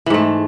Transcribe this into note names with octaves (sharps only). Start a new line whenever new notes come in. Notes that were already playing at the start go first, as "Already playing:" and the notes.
G#2 E3 A3